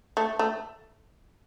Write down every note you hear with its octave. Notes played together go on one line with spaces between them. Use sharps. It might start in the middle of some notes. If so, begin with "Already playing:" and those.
A3
A3